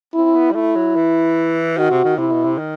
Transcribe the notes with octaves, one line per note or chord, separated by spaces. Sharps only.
C4 E4
B3
G3
A3 E4
F#3
E3
D#3 F#4
C3
D#3
C3 E4
B2
C3
D#3